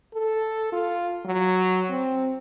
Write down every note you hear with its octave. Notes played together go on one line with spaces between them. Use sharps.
A4
F4
F#3
C4